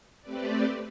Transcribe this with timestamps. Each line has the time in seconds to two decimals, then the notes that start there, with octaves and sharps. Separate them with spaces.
0.22 A3 C4 G4 B4 D5